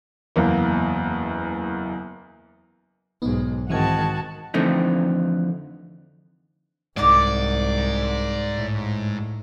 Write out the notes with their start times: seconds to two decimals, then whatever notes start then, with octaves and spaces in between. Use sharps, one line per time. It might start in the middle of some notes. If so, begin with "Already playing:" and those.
0.36 F#1 E2 A#3
3.22 B1 G#2 B3 D#4
3.70 G#2 D#3 E3 C4 F#4 A5 G#6
4.54 F2 D3 E3 A3 C4 D#4
6.97 C2 G#2 D#4 D5 F5 F#5 D6
8.56 A2